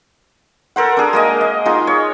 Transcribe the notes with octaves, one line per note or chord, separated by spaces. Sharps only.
A4 A#4 C5 F#5
D4 G#4
G#3 A#3 D#5
D#5
G#3 D#4 F4
C#5